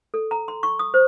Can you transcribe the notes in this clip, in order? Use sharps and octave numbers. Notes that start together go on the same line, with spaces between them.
A4
A#5
C6
C#6
D#6
C5